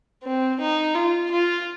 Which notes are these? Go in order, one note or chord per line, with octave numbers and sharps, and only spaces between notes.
C4
D#4
F4
F4